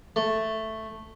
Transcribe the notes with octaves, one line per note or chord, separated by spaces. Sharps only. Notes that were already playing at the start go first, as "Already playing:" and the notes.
A3